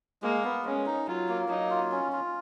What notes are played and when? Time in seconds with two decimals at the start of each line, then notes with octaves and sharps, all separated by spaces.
0.22 G#3 A#3
0.44 B3
0.65 G#3 C#4
0.86 D#4
1.07 F#3 F4
1.29 A#3
1.49 F#3 D#4
1.70 F4
1.92 C#4
2.12 F4